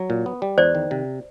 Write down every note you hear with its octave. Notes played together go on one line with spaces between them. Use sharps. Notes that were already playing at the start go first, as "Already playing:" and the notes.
Already playing: F#3
A#2
B3
G3
E2 C5 D5
D#3
C3